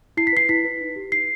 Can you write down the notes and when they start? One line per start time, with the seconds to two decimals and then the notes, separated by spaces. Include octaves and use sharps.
0.17 E4 C7
0.27 B6
0.33 B4 C7
0.49 E4 B6
0.65 B4
0.81 D#4
0.96 G4 B4
1.12 D#4 C7